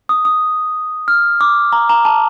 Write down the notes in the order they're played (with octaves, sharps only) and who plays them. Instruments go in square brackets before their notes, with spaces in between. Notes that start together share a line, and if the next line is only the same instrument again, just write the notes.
[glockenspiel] D#6
D#6
F6
D6
A#5
A#5
A5